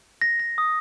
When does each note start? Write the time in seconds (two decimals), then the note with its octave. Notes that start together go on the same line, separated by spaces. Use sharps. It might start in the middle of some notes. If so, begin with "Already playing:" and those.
0.21 A#6
0.40 A#6
0.58 D#6